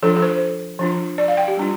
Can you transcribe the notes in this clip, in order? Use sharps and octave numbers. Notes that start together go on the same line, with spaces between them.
F3 D4 F4 A4
A4
C5
F3 D4 F4
D5
F5
G5
G4
G3 D4 F4